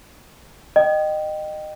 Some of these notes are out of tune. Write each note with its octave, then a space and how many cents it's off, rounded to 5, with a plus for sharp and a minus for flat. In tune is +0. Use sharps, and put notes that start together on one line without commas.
D#5 -25 G5 -15